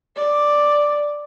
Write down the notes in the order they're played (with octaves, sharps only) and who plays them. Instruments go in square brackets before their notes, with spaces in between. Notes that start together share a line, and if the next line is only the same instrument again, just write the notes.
[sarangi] D5